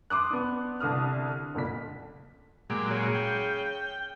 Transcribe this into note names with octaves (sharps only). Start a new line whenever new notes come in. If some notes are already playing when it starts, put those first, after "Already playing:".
C6 D6 D#6 F#6
B3 D4
C2 D3 D#6 F6
F#1 D2 A#2 B6
A#2 F#3 G#3 G4
C#3
G5